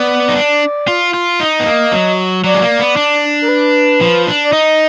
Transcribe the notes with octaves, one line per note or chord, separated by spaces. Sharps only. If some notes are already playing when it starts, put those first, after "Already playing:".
Already playing: B3 D5
D#4
D4
F4
F4
D#4 D#5
B3
A#3
F#3
F#3 D5
G#3
A#3
B3
D4
A#4
B4
F3
D4
D5
D#4 D#5